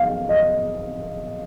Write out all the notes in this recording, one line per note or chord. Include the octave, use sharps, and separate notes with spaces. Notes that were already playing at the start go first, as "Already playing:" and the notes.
Already playing: F5
D#5